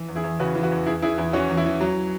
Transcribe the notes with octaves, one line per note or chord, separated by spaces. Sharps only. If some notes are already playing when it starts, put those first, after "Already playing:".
Already playing: E3
E2
E4 G#4
E2
C#3 F#4 B4
E3
F#4 B4
E2
E2 E4 G#4
E3 E4 G#4
E2 E4
E3 C#4 F#4
E2
E4
E3
F#3